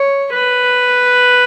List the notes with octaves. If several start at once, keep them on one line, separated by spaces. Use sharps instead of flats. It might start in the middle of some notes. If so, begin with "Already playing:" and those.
Already playing: C#5
B4